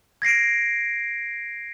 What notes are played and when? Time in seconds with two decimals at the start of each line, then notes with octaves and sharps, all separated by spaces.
0.22 G#6 A#6 C7 D7